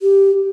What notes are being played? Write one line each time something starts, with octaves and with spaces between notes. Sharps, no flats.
G4